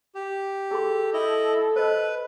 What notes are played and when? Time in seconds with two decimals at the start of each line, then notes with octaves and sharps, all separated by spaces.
0.15 G4
0.71 G#4 A4 C6
1.14 E4 D#5
1.76 B4 C5 D#5